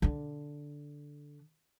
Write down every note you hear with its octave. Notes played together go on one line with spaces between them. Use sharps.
D3 D4